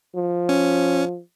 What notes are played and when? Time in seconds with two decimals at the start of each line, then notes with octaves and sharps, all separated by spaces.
0.16 F3
0.49 C#4